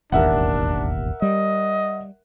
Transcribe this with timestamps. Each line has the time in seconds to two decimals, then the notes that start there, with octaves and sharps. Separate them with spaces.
0.12 E1 A1 D#2 D4 A#4 E5 F#5
1.22 G3 D#5